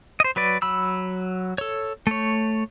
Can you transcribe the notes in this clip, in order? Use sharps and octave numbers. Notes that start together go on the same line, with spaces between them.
C5 D#5
F#3 B4 D5
F#3 B5 E6
A4 C#5
A3 C#5